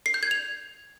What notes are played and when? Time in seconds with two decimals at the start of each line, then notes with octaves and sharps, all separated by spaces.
0.06 C7
0.14 G6
0.23 G#6
0.31 F7